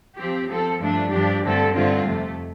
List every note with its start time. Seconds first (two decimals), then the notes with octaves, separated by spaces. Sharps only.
0.17 F3 C4 G4
0.48 F3 C4 A4
0.79 G2 F3 A3 D4
1.11 G2 F3 D4 G4
1.42 G2 D3 A3 C4 A4
1.74 G2 D3 A3 C4 F4
2.05 F2 C3 A3